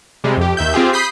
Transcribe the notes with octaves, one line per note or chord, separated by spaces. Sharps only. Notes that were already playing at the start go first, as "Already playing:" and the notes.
C3 G3 G#3
F2 G4
D#2 E5 G6
C4 F4 G4 G#4
B5 D#6 G6 B6 C7